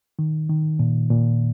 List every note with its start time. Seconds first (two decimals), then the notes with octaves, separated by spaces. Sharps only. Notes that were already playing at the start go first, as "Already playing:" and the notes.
0.19 D#3
0.49 D#3
0.79 A#2
1.10 A#2